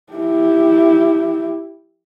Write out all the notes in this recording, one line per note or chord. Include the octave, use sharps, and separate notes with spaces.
E4 G4